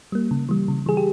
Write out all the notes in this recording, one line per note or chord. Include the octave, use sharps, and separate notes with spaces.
G3 A#3
C#3
E3 G3
C#3
E3 G3 G#4
G4